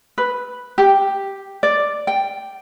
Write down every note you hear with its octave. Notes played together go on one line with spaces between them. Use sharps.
B4
G4
D5
G5